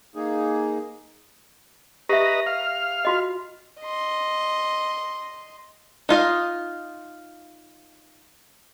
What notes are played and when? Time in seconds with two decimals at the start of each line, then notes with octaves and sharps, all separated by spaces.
0.15 A#3 D#4 G#4
2.09 G4 B4 D#5 E5 A#5
2.47 F5
3.05 F4 F#4 D#5
3.79 D#5 C6
6.09 D#4 F4 D#5 F5